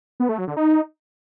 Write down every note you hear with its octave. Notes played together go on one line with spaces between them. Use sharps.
B3
A3
F#3
D3
D#4